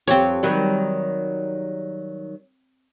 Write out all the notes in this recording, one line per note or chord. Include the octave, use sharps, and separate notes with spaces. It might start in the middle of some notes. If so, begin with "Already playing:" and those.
F2 C4 G4 C#5
D#3 F#3 G3